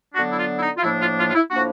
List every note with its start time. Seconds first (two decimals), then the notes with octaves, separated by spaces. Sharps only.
0.14 D3 F#3 B3 D4 F#4
0.30 E4
0.37 F4
0.56 E4
0.61 D#4
0.77 F4
0.82 A2 F3 A#3 D4 E4
0.99 F4
1.17 F4
1.28 F4
1.34 E4
1.51 A2 F3 A#3 D4 F#4